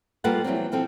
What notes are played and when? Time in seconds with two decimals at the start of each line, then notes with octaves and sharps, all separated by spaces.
0.24 G3 A#3 F4 A4 B4 F#5
0.44 E3 F#3 G3 C4
0.72 B2 F3 C4 A4